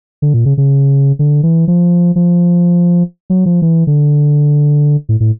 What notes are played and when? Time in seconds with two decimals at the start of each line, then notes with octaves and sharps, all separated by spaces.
0.22 D3
0.34 A#2
0.46 C#3
0.58 C#3
1.19 D3
1.43 E3
1.68 F3
2.16 F3
3.30 F#3
3.46 F3
3.62 E3
3.87 D3
5.09 A2
5.20 A2